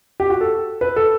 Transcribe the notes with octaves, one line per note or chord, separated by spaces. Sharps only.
G4
F#4
A4
B4
A4